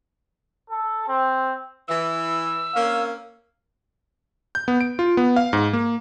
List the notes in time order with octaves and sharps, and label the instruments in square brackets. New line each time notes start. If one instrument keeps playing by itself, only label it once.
[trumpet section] A4
C4
[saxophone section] E3 [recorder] E6
[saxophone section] A#3 C4 C#4 [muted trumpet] F5
[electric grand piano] G6
B3
D7
F4
B3
F5
G#2
A#3